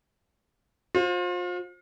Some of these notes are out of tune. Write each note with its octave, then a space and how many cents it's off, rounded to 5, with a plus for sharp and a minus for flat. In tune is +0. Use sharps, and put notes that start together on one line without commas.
F4 +35 C5 +20